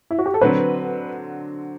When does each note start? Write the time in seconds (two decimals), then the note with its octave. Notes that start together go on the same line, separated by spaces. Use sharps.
0.11 E4
0.19 F#4
0.26 G4
0.34 A4
0.41 D3 F#3 C4 B4